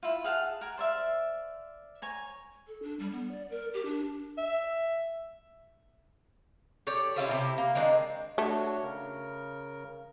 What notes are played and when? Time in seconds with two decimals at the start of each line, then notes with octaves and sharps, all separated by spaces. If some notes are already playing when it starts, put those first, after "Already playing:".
0.03 E4 F4
0.24 G#4 F5 F#5 A5
0.61 A#4 G#5
0.77 C5 D5 E5 F5
2.02 C#5 G#5 A#5
2.67 A4
2.83 D4
2.99 G3
3.12 B3
3.31 D5
3.50 A#4
3.74 G4
3.85 D4
4.38 E5
6.87 G4 A4 C#5 D5
7.16 C#4 E4 F4 C5
7.30 C3 E4 G4
7.58 A#3
7.75 D#3 G#3 C4 D4
8.38 A3 D4 F#4 C#5
8.84 C#3 A#4